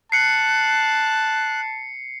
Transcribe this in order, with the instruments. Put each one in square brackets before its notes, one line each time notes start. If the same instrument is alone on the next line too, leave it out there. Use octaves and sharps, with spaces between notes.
[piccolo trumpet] A5 [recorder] F#6 [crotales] C7 C#7